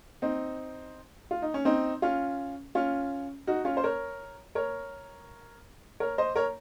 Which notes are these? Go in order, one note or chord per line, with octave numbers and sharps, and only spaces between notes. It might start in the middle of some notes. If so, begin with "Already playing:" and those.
C4 D#4
F4
D#4
C#4
C4 D#4
C#4 F4
C#4 F4
D#4 F#4
C#4 F4
C5
A#4 C#5
A#4 C#5
A#4 C#5
C5 D#5
A#4 C#5